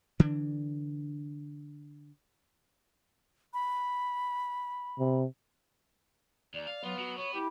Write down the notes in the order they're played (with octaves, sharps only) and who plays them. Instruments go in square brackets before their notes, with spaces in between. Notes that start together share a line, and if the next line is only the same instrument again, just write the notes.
[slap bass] D3 E3 D4
[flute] B5
[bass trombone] C3
[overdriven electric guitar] D#2 [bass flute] D5
[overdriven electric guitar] F5
[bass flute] F#3 [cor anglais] B3 [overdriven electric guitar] F4
[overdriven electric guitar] F#3 [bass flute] F#4
[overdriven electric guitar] B3 [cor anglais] C#5
[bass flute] E4 [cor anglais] G4